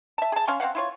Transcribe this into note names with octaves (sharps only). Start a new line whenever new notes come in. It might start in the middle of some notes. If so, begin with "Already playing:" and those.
E5 A5
G#4 A5
C#4 F5 C6 C#6
C4 C#5 F5 F#5
E4 F4 C#5